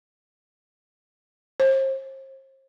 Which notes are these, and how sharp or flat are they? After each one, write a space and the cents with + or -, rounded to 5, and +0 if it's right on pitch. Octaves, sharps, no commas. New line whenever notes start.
C5 +40